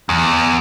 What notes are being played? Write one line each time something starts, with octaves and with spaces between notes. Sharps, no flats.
E2